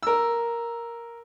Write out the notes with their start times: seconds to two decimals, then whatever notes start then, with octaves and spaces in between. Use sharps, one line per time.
0.03 A#4 E6